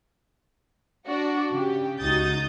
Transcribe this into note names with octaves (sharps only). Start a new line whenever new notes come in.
D4 F#4 D5
C#3 G4
C#2 D#4 F#4 D#6 G6 A6